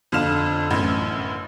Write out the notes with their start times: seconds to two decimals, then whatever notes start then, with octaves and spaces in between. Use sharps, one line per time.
0.12 F2 D3 F5 F6 E7
0.70 A1 F#2